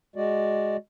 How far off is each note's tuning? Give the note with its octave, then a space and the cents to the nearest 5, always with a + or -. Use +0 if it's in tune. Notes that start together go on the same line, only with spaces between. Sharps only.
G#3 +0 F#4 +0 D5 +0